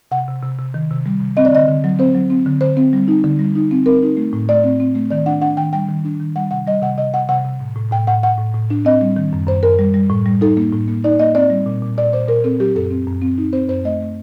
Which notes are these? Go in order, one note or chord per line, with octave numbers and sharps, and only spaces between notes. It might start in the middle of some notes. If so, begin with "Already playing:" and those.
C3 F#5
C3
C3
C3
D#3
C3
G3
C3
C4 D#5
D5
D3 D#5
D3
F#3
C4 C5
F#3
C4
D3
D3 C5
C4
G3
D#4
D3
G3
D#4
C4
C4 A#4
D#4
A3
A2
A3 D5
C4
C4
A3
D#3 D5
D4 F#5
D4 F#5
D#3 G5
G3 G5
D#3
D4
D#3
G3 F#5
C3 F#5
G3 D#5
C3 F#5
C3 D#5
C3 F#5
C3 F#5
C3
A2
A2
A2 G5
A2 F#5
A2 F#5
A2
A2
D4
C4 D#5
G3
D#3
F#2
F#2 C5
F#2 A#4
G3
G3
A2
G3
D#4 A4
A#3
A2
A#3
D#4 D5
A#3 D#5
C4 D5
G3
A#2
A#2
A#2 D5
A#2 C5
A#2 A#4
C4 A4
F#3 G4
F#2 A4
C4
F#2
C4
D#4
C4 C5
F#2 C5
A3 D#5
A3